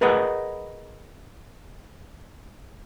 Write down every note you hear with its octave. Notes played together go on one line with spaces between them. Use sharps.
G#4 A#4 B4 D#5 F#5